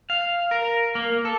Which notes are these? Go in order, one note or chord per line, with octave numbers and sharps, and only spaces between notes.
F5
A#4
A#3
A4